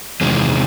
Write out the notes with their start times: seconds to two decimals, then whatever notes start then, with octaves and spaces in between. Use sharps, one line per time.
0.21 E2 C3 D#3 G#3 C4